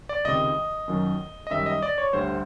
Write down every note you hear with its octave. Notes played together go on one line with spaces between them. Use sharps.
D5
C#2 C3 D#3 D#5
F#2 D#3 F#3
D#5
F#2 D#3 G3 E5
D#5
D5
C#5
D2 D3 G3 C5